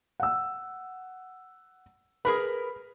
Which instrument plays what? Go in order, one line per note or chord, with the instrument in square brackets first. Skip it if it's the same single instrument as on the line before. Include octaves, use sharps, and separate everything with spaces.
[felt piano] F#5 E6
[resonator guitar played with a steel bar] G#4 A#4 B4 [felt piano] B5